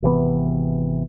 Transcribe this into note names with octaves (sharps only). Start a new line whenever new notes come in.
G#1 C3 E3 B3